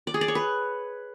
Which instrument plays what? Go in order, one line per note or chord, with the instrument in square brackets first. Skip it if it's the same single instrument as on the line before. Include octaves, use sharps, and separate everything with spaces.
[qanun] D5
G#4
D5
C#5
B4